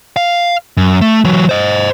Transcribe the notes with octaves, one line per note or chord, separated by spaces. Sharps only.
F5
F#2
A3
E3 F#3
C5 D#5